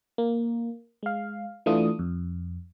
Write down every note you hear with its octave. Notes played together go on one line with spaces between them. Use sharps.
A#3
G#3 F5
E3 A3 D4 F4 D#6
F2